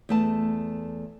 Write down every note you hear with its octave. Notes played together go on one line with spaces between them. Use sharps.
E2 A3 A5